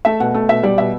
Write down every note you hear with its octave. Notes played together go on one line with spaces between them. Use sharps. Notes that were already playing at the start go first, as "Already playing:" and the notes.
A3 E5
B2 F#5
A3
B2 E5
G3 D5
B2 E5